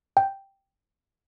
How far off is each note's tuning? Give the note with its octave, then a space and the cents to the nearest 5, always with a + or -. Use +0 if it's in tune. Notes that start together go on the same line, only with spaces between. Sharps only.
G5 +0